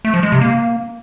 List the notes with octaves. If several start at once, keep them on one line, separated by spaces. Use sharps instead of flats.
A3
F3
G#3
C3
A#3